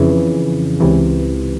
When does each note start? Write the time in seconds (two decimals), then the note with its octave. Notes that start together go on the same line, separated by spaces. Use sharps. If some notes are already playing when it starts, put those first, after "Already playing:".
Already playing: F2 C#3 E3
0.80 C#2 C3 E3